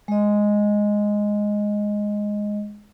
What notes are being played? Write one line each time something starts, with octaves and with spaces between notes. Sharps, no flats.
G#3 D#5